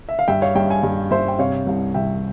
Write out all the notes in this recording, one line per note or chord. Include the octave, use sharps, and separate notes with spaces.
E5
F5
G2 E5 G5
C#5 F5
G2 E5 G5
F5 G#5
G2
G2 C5 E5
G5
C3 C#5 F5
C2
C2 E5 G5